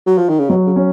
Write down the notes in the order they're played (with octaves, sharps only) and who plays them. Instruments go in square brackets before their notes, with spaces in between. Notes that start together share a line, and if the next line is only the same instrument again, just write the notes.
[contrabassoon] F#3
F3
D#3
C#3
[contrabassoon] B2 [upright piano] F#3
[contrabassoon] C#3
[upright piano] C#4